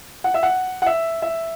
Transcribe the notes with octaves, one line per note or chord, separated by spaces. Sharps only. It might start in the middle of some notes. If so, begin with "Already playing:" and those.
F#5
E5
F#5
F#5
E5
E5